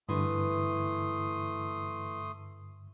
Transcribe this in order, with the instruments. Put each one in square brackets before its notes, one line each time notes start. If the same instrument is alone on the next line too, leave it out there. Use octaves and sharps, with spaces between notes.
[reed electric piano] G2 D3 [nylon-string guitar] E3 E4 [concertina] A3 C6 D#6